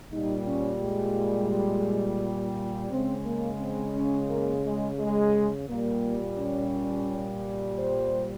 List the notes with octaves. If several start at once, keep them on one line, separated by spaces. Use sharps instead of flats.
A#2 G3 D#4
C#4
G#3
C#3 G#3 C4
A#3
C4
C#4
A#3
G#3
G#3
A#2 G3 A#3
C#4
C5